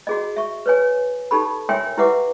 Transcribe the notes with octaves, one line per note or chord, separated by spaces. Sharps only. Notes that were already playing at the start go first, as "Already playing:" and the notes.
F#4 G#4 D#5
E5 C#6
B4 C#5 G#5
D#4 G4 A4 B5
A#4 C#5 E5 G5 G#5 C6
E4 G4 B4 E5 F#5 D6